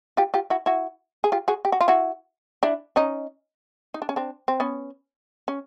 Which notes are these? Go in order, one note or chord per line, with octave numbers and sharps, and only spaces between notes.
F4 G4
F4 G4
E4 F#4
E4 F#4
G#4
F4 G4
F#4 G#4
G4
F#4
F4
E4 F#4
D4 E4
C#4 D#4
D#4
D4
C#4
C4 D4
C4
B3 C#4
C#4